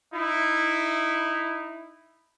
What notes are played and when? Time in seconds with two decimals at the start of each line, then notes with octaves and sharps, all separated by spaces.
0.14 D#4 E4